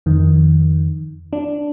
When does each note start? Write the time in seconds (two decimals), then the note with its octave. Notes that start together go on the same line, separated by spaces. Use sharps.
0.06 F2 D#3
1.33 D4